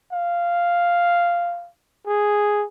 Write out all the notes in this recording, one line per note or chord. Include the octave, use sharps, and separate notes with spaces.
F5
G#4